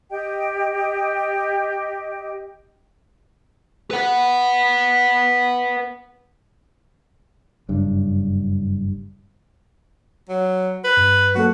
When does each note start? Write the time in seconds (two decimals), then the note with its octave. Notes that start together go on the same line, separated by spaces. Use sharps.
0.11 G4 D#5 G5
3.91 B4 F#5
7.69 F#1 G2
10.29 F#3
10.84 B4
10.97 G2
11.35 F#3 A#3 F#4 A4